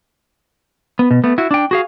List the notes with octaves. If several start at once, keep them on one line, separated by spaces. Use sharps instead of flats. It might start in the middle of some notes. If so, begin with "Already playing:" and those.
B3
B2
A3 B3
E4 F#4
D4 G5
F#4 G#4 F5